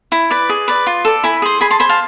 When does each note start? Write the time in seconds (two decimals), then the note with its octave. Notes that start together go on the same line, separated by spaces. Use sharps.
0.12 E4
0.30 B4 D5
0.49 G#4
0.68 B4 D5
0.87 F4
1.05 A4 D5
1.23 E4 G#5 B5
1.42 G#4 C5
1.61 G#4 G#5 B5
1.70 A5 C6
1.80 C5 G#5 B5
1.89 F5 A5